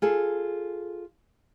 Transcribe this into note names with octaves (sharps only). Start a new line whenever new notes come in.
F4 G#4 A4